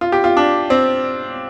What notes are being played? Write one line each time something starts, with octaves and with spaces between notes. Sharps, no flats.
F4
G4
F4
D4
C4